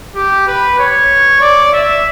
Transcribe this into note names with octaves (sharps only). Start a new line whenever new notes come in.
G4
B4
C#5
D5
E5